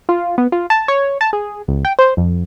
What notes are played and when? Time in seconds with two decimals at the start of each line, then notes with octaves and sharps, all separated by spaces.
0.09 F4
0.38 B3
0.52 F4
0.70 A5
0.88 C#5
1.21 A5
1.33 G#4
1.68 C#2
1.85 G5
1.99 C5
2.17 F2